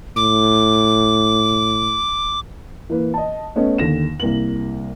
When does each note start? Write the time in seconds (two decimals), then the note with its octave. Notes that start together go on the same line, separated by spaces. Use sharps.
0.16 A2 D6
2.90 E3 A#3 B4
3.14 D#5 A5
3.56 A3 B3 C#4 D#5
3.78 D#2 D3 A#6 E7
4.20 C2 A#3 F#7